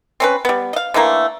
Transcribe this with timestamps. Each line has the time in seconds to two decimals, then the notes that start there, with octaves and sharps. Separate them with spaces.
0.20 C4 C#4 B4
0.45 G3 B3
0.73 D#5 F5
0.94 D3 E3 A3 A#3